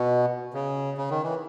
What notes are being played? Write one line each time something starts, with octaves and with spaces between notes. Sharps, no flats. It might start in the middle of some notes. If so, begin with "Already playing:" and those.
Already playing: B2
C#3
C#3
D#3
E3